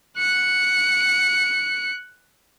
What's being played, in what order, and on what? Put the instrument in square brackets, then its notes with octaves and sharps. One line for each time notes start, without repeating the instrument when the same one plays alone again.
[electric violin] F#6 C#7